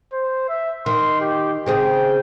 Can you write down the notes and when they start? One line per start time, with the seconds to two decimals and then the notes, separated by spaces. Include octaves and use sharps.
0.13 C5
0.49 E5
0.86 D#3 C6
1.21 G4
1.66 C#3 C4 G#4 G5